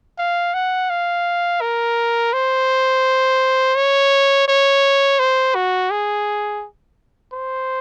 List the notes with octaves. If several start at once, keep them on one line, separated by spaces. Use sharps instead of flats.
F5
F#5
F5
A#4
C5
C#5
C#5
C5
F#4
G#4
C5